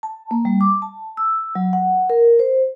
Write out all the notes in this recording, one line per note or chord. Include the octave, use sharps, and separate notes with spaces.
A5
A#3
G3
D6
A5
E6
F#3
F#5
A#4
C5